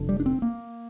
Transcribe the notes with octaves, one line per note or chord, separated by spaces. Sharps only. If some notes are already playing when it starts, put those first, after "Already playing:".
Already playing: F1 F2 D3
G3
D4
C4
A#3